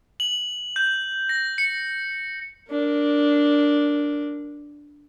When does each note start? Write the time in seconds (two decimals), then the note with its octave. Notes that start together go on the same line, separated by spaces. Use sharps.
0.20 F#7
0.76 G6
1.29 A#6
1.58 C#7
2.71 D4 A#4